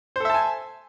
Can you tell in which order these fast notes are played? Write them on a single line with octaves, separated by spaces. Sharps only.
C5 A4 E5 A5 G#5